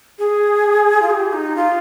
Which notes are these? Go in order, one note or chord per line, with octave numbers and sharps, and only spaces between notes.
G#4
F4
G#4
G4
D#4
F4